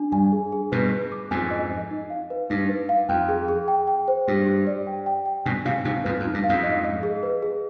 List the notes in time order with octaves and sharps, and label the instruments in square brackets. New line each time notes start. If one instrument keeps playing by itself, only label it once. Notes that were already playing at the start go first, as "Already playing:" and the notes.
Already playing: [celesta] D4 G#5
[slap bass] G2 [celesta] G#5
[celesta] G#4
G#4
[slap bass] G2 B2 [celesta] B4
[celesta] B4
D6
[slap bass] F2 G#2 [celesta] G#5
[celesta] D#5
D#5
D#4
F5
B4
[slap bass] G2 [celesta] D#4
[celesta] B4
F5
[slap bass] F2 [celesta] G5
[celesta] G#4
G#4
G5
G5
C5
[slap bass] G2 [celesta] G4
[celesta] G4
D5
G5
G5
G5
[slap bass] G2 B2 [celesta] G#5
[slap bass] G#2 C3 [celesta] F5
[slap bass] G#2 C3 [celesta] D#4
[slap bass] F2 G#2 [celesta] B4
[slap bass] F2
[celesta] D#4
[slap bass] G2
[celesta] F5
[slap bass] F2 G#2
[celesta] D#5
D#5
G#4
B4
G#4